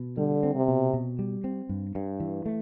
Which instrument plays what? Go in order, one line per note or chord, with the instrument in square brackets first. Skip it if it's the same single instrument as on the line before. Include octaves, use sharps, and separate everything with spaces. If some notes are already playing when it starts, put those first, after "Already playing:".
Already playing: [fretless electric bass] B2
[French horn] D3 [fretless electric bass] G3
[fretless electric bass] C4
[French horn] C3
[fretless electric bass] B2
B2
G3
C4
G2
G2
E3
A3